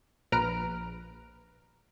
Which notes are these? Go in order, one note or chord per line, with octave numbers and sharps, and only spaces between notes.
A#1 B4 A#5 F6 D7